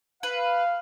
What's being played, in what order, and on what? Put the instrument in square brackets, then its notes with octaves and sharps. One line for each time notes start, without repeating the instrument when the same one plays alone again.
[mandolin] B4 [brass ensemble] F5